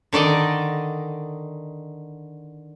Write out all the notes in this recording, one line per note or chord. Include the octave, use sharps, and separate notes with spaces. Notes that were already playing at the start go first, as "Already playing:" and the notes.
D3 D#3 D5 D#5